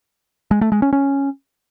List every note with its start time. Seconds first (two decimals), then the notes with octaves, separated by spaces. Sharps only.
0.51 G#3
0.61 A3
0.72 G#3
0.82 C#4
0.93 C#4